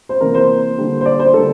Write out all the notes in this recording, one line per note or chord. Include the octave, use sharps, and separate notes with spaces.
C5
C3 E3 A#3 A#4
C5
D3 G3 A#3
C5
D5
C5
D3 G3 A#3 A4